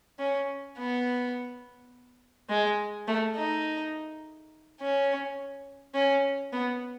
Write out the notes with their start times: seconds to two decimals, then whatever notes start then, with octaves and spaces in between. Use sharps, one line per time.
0.19 C#4
0.78 B3
2.50 G#3
3.07 A3
3.36 D#4
4.80 C#4
5.95 C#4
6.53 B3